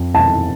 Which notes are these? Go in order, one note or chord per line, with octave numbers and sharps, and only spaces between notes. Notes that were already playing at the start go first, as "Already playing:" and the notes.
Already playing: F2
A5